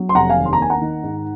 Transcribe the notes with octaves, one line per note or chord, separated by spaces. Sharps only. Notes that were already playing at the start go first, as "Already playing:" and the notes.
Already playing: F#3
C6
F1 F#5 A#5
F5 G#5
D#2
C6
A#5
A#3 G#5
F#5 A#5
D#3
G#2